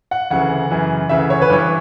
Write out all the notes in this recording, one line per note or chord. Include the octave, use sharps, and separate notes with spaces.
F#5
D2 C#3 E3 F#5
F#2 C#3 E3
D2 C#3 E3 E5
C#5
B4
G2 E3 C#5